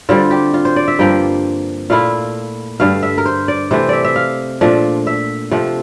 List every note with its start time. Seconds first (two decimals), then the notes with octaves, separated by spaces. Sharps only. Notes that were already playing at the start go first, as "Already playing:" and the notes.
0.09 D3 G3 C4 F4
0.31 G4
0.54 F4
0.65 C5
0.76 D5
0.88 E5
0.99 G2 F3 A#3 G5
1.90 A#2 A3 E4 F5
2.80 G2 D3 A3 F5
3.03 E5
3.18 A#4
3.26 C5
3.48 D5
3.71 C3 E3 A3 C5
3.89 D5 E5
4.05 E5
4.16 F5
4.61 A#2 F3 A3 D4
5.07 E5
5.51 C3 F3 A3